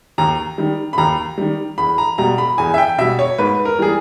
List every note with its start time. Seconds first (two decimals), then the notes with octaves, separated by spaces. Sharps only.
0.18 D#2 A#5
0.58 D#3 G3
0.93 B5
0.98 D#2 A#5
1.38 D#3 G3
1.78 E2 B5
1.98 A#5
2.18 B2 G3 A#5
2.38 B5
2.58 E2 G#5
2.74 E5
2.78 G5
2.98 B2 G3 E5
3.19 C#5
3.38 G#2 B4
3.65 A#4
3.78 E3 G3 G#4